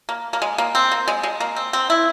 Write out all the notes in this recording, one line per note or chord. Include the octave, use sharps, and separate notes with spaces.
A#3
A#3
G#3
A#3
C4
A#3
G#3
G#3
A#3
C4
C4
E4